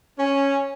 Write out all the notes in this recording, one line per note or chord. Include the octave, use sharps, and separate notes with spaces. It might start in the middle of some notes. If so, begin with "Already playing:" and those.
C#4